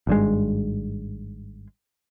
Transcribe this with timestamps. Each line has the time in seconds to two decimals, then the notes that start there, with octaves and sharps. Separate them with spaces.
0.07 G#1 G2 G#3